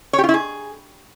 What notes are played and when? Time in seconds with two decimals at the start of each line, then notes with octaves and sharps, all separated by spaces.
0.13 C#5
0.18 G4
0.24 F4
0.29 E4
0.34 G#4